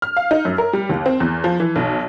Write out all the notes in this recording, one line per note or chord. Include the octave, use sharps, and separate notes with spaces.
F6
F5
D#4
F#2
A#4
G3
D#2
C4
E2
F3
E3
B1